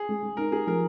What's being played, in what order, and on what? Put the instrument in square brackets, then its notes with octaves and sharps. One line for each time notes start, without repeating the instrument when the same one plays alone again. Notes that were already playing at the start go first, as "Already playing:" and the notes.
Already playing: [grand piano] G#4
[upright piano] G#3
G#3
[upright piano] D#4 [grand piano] A#4
[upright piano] G4 [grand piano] G#4
[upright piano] F3 [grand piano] A#4